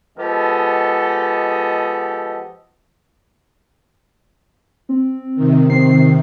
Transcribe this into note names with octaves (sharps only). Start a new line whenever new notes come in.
F3 G#3 B3 G4 A4 D#5
C4
C3 D#3
C4 C7